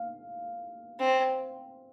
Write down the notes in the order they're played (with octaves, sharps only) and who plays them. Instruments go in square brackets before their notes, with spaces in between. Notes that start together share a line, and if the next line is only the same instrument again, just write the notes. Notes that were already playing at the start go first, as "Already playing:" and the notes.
Already playing: [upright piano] F5
[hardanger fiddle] C4